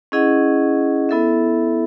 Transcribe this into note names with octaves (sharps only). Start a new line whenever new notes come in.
C#4 E4 G#4 D#5 F#5
B3 E4 A4 E5